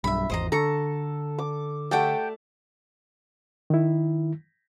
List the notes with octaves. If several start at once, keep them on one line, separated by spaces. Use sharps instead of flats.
B1 G2 E5 B5
G#1 E2 C5 D#5 A#5
D3 A4 A#5 C#6
D6
A3 G4 F#5 G5 A5
D#3 E4